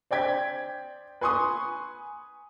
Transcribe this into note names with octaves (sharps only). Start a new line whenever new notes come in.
C5 D5 G5 G#6 B6
B4 G#5 C6 C#6 D#6